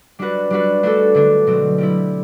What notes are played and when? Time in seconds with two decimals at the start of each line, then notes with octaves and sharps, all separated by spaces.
0.19 G3 D4 F#4 B4
0.50 G3 D4 F#4 B4
0.83 A3 D4 F#4 A4
1.15 D3 A3 D4
1.47 B2 F#3 C4
1.78 G3 C4 E4